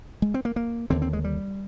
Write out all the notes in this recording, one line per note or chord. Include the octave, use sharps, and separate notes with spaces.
G#3
C4
A#3
A#3
D#2 D3 C4
C4
G#3
G3